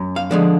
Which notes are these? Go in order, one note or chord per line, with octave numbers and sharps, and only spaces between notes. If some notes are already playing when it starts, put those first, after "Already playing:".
Already playing: F#2
F5
D3 F3 G#3